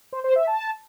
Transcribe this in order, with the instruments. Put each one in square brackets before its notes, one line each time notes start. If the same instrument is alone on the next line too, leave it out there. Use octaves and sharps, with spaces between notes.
[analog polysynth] C5
C5
E5
A5